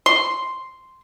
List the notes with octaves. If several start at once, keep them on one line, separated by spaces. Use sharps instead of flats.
C6